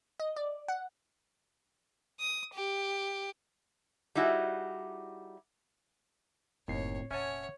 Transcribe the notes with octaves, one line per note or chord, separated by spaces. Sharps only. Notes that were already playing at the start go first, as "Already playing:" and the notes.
D#5
D5
F#5
D#6
G4
G3 D#4 E4 F#4 G#4
F#1 D#2 A2 C4 C#5 C7
F1 A#2 C#4 C#5 E5 F#5 G#5 A5